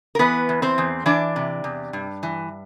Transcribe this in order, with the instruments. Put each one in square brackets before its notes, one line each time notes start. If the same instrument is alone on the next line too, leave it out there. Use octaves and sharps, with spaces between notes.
[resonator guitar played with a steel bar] A#4
E3 B3 B4
E2
C4 C5
E2
E3 D4 D5
C3
E2
G2
E3